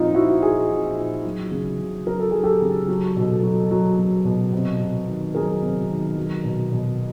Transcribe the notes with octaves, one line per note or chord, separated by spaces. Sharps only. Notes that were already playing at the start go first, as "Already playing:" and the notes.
Already playing: A#2 F3 C4 D#4 F4
F3 E4 F#4
A#2 F#4 G#4
A#2
A#2
F#3
C#3
C#3
F#3 A#4
A4
F#3 G#4
G4 A4
C#3
F#3
B2
F#3
F#3
F#3
B2
C3
C3
D#3
F#3 G#4 A#4
C3
D#3
F#3
B2
B2